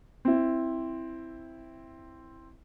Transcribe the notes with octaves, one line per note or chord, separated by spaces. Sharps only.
C4 E4